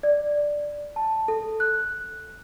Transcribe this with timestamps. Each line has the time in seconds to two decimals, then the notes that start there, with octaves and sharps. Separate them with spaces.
0.03 D5
0.96 A5
1.28 A4
1.60 F#6